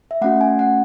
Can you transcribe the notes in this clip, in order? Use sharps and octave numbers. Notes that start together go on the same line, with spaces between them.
E5
A3 C#4 F#4 F#5
G#5
F#5